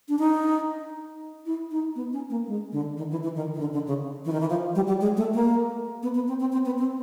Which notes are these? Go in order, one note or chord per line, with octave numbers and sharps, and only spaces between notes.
D4
D#4
E4
D#4
B3
C#4
A#3
G#3
D3
D#3
E3
E3
D#3
D#3
D3
D3
C#3
E3
D#3
E3
F3
G3
G3
G#3
A3
A#3
B3
B3
C4
C4
C4
B3
C4